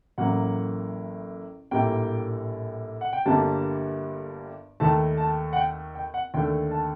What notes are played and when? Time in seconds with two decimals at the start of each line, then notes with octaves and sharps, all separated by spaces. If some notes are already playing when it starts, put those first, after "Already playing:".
0.18 A1 A2 F#3 A#3 F#5
1.71 A#1 A2 G3 A#3 G5
3.01 F#5
3.13 G5
3.26 G1 G2 D3 G3 A#3 A5
4.80 D#2 D#3 A3 A5
5.17 A5
5.53 F#5
5.56 G5
5.95 G5
6.14 F#5
6.34 D#2 D3 A3 G5
6.71 A5